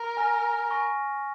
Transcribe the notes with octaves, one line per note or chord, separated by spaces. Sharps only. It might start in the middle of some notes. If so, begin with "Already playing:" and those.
Already playing: A#4
G#5 F6 A#6
G#5 C#6 A#6